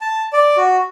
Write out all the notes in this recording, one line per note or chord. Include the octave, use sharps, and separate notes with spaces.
A5
D5
F#4